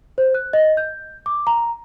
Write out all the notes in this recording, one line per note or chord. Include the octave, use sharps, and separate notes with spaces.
C5
F#6
D#5
G6
D6
A#5